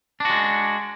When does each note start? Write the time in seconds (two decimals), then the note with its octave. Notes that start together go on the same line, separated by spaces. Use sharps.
0.20 D4
0.25 F#4
0.30 G#3